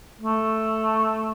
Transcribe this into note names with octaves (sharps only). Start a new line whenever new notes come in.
A3